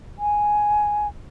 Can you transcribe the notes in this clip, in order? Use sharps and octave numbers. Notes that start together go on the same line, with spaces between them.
G#5